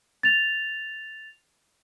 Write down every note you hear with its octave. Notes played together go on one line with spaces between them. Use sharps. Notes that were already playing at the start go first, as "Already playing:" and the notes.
A6 F7